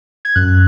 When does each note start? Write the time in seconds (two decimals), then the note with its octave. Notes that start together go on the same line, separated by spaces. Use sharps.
0.25 G#6
0.35 F#2 F#6